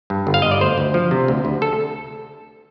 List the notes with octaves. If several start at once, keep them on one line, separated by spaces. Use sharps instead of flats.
G2
G1
F5
G1 D#5
D5
D2 C5
D2
F3
C3
D2
D2
A4